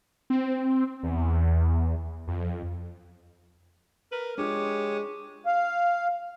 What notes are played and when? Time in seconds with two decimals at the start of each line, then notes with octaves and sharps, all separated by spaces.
0.30 C4
1.03 E2
2.28 F2
4.12 A#4 B4
4.38 G#3 D4 F4 G4 C#5
5.46 F5